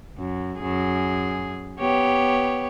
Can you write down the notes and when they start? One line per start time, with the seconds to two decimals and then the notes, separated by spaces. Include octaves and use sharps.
0.18 F#2
0.59 F#2 G#4
1.80 B3 G4 C#5